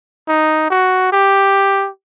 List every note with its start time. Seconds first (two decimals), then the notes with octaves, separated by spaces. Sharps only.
0.28 D#4
0.70 F#4
1.13 G4